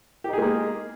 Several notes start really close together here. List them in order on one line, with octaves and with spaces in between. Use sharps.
G4 D#4 G#4 G#3 A#3